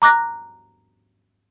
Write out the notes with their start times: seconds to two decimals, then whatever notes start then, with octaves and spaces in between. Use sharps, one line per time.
0.02 A#5 D6 F#6 A#6